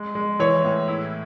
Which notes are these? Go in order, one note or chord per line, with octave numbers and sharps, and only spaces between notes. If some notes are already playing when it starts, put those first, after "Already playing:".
Already playing: G#3
G#3
E3 C#5
A2
E4